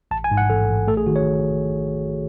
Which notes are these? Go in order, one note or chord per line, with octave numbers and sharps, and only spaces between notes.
A1 A5
G#5
G#2
F#5
A1 A4
A1
A3 A4
G#4
D#3 F#4
C#5